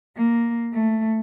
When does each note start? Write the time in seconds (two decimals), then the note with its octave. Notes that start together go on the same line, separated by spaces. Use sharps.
0.16 A#3
0.72 A3